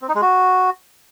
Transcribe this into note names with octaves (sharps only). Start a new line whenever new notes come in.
C4
D#4
G#3
F#4